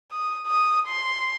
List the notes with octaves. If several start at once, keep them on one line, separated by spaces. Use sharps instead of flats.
D#6
D#6
C6